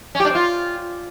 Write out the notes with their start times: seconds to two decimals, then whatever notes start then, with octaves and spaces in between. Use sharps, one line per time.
0.15 C#4
0.20 G4
0.25 D4
0.30 C4
0.35 F4